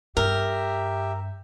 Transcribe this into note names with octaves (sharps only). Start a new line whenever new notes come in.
G2 G4 A#4 E5